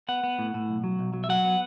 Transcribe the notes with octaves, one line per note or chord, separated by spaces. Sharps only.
B3 F#5
B3
A2
A2
B1
F#3
B1
F#3
E5
F#3 F#5
B3